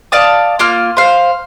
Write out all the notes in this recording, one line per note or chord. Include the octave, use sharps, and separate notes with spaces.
D5 F5 A5 D#6
A#3 F4 F6
C5 F5